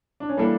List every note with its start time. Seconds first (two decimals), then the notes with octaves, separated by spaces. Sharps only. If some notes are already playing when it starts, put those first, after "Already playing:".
0.20 D4
0.29 C#4
0.37 E3 G3 A#3 D4 A4